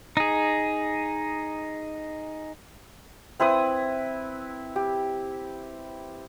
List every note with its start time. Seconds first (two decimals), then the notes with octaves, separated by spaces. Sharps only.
0.17 D#4 G#4
3.40 C4 E4 B4 D#6
4.76 G4